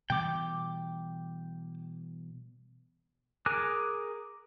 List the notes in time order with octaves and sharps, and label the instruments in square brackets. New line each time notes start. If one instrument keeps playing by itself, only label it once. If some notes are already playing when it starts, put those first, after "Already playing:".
[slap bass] B2 E3 G3 [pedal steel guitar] G5 D6
[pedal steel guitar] G#4 A#4 G#5 D6 F#6